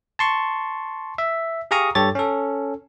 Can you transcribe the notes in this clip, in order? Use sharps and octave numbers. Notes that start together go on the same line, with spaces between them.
A5 C6 C#6
E5
G4 G#4 F5 A#5 C#6 D#6
G2 G4 A4 C#5 A6
C#4 A4